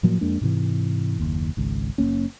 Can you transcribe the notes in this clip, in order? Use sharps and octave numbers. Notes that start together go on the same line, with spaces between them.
A2 F3 F#3 A#3
F2 G#3 A#3 D4
G#2 C3 E3
F#1 D#2
G#1 C#2
F#1 A#2 A#3 C#4